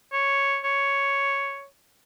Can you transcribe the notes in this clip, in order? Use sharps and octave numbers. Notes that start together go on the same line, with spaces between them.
C#5
C#5